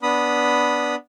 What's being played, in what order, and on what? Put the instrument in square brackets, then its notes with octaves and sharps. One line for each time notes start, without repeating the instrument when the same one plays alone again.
[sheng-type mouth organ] B3 D4 B5 D#6